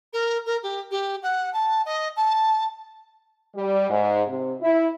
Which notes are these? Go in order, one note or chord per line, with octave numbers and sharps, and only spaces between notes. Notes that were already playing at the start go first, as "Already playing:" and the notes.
A#4
A#4
G4
G4
F#5
A5
D#5
A5
G3
G#2
C3
E4